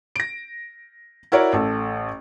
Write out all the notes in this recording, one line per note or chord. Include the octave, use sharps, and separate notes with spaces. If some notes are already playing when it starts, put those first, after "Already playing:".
A#6 D7
E4 F#4 A#4 C#5 D5
A1 A4